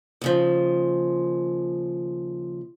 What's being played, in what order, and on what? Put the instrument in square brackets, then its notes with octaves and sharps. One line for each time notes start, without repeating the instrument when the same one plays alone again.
[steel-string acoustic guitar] D#2 C#3 F3